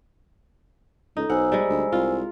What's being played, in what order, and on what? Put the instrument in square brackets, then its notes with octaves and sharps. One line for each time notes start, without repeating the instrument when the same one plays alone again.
[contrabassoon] C#2 [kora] D#4 [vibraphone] A4
[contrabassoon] B1 [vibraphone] C5 G#5 E6 [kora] F#5
[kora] G3 G#3
[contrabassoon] D2
[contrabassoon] C2 [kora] F4